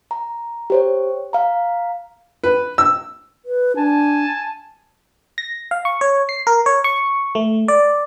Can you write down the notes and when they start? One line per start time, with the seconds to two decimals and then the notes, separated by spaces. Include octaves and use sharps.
0.11 A#5
0.70 G4 C5 C#5
1.33 F5 A#5
2.44 B4
2.78 E6
3.45 B4
3.76 D4 G#5 A5
5.38 A#6
5.71 F5
5.85 C#6
6.01 C#5
6.29 C7
6.47 A#4
6.66 C#5
6.84 C#6
7.35 A3
7.68 D5